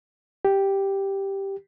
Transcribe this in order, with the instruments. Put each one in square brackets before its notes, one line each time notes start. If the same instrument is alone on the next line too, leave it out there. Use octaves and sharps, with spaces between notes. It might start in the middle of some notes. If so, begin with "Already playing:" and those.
[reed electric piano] G4